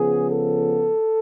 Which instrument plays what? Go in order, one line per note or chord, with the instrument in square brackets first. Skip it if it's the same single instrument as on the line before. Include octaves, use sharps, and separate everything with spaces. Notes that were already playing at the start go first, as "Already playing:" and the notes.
Already playing: [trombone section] C#3 F3 B3 G#4
A4